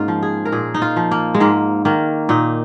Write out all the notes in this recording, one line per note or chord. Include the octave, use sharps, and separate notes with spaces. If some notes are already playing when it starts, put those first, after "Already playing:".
Already playing: G#2 A#3 C#4 D#4 F4
F3
G#4
A#4
A#2 G#4
D#4
F4
F3
A#3
G#3
G#2 A#3
D#3 A#3
A#2 D#4